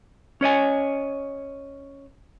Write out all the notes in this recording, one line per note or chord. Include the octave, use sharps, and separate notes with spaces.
C#4 C#5 D#5 G#5